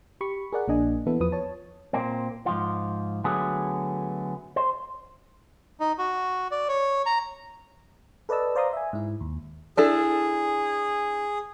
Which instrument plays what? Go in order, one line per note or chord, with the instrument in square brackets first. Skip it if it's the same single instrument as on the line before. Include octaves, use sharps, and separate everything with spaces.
[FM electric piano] G4 B5 C#6
G#4 A#4 D5 F#5
A#1 A#3 D4 D#5 G#5
E3 B3 E4 A4
E2 F3 B4 D#6
C#5 A5
[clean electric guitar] A#2 A#3 C4
G#2 F3 F4
D3 F#3 A3 B3 G#4
C5
[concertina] D#4
F#4
D5
C#5
A#5
[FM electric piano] A4 B4 D5 D#5 A5 E6
C5 D5 F5 A#5 C6 D#6
E5 G#5
G#2 E4
D#2
[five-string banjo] D4 E4 A4 [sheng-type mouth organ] G#4